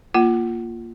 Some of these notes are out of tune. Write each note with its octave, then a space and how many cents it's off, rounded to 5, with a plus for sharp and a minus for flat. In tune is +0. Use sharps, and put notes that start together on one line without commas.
A#3 +0 F4 -10 F#5 +30